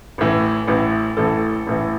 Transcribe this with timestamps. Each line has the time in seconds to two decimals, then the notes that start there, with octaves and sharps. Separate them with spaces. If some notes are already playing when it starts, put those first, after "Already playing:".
0.18 A1 A2 E3
0.68 A1 A2 E3
1.17 A1 A2 E3 A4
1.67 A1 A2 E3